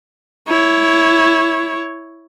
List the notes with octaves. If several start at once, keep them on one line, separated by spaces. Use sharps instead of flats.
E4 C#5